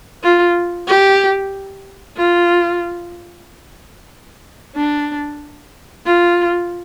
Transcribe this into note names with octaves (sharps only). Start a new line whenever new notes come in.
F4
G4
F4
D4
F4